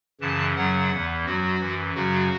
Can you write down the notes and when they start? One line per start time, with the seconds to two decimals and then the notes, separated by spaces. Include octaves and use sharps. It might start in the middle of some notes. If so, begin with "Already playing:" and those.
0.21 F#2 C#3 E3 A5
0.56 F#2 C#3 F#3 F#5
0.91 E2 E3
1.25 F#2 F#3 F#4
1.60 F#2 E3
1.95 F#2 C#3 F#3 F#4